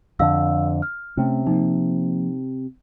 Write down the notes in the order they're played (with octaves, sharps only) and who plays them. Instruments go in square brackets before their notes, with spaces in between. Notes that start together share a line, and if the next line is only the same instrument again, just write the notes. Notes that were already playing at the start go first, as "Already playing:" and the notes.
[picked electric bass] F2 D3 [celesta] F5 E6
[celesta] F6
[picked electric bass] C3 [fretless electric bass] A3 C#4
[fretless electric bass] F3 A#3 [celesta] D#4